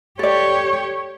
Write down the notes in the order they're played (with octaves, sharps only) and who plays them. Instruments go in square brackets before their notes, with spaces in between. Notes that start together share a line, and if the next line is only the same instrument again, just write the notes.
[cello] G4 C#5 [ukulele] A4 D5